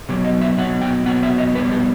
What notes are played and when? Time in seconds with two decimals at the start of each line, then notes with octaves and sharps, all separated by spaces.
0.09 B2 F#3 B3 G4
0.25 D#5
0.41 E5
0.58 B2 F#3 B3 F#5
0.82 G5
1.06 B2 F#3 B3 F#5
1.23 E5
1.38 D#5
1.55 B2 G3 B3 B4
1.71 G4